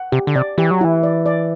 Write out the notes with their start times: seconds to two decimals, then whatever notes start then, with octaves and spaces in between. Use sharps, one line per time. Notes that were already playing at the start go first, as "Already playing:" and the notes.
Already playing: F#5
0.12 C3 G4
0.27 D3
0.35 C3 D5
0.58 E3 G4
0.71 F#3
0.81 E3 E4
1.03 D5
1.26 D5